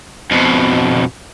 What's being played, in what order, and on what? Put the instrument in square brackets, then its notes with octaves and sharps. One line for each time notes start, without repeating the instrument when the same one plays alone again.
[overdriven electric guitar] F2 B2